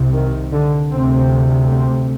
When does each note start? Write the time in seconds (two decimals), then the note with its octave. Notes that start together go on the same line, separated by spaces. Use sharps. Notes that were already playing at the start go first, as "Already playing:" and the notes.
Already playing: C2 C3
0.12 D#3
0.52 D3
0.92 D2 C3 C4
1.71 C4